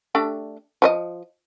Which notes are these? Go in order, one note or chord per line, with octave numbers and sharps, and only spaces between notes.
A3 D4 G4
F3 B4 D#5